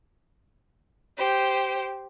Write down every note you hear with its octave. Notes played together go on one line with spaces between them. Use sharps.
G4 C5